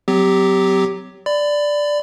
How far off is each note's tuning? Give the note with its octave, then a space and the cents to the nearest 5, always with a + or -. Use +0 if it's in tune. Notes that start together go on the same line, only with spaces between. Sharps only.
F#3 +10 C4 -40 G4 +0
D5 +0 B5 +30